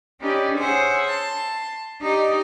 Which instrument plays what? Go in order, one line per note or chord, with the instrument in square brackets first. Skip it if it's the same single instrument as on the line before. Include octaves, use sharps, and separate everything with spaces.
[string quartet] C#4 D#4 G4 B4 D5
G#4 C5 C#5 E5 F#5 G#5
A5 C6
D#4 G4 D5 D#5